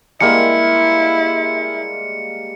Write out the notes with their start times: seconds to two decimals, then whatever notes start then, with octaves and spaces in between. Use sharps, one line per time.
0.21 G3 G#3 A#3 E4 C#7